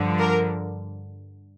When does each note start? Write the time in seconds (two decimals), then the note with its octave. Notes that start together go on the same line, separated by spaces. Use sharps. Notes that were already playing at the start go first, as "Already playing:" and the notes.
Already playing: G2 D3 F3
0.19 A#4